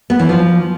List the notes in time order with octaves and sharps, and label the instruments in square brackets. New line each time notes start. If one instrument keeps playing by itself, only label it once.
[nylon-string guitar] B3
E3
F3